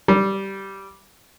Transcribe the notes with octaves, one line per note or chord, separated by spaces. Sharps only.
G3